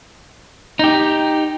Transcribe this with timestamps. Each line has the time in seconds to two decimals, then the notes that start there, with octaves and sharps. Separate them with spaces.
0.79 D#4 G4